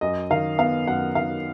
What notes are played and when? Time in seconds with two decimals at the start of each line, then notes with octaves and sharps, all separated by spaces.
0.01 F#2 D#5
0.30 D#3 F5
0.59 B3 F5
0.87 F#2 F#5
1.15 D#3 F5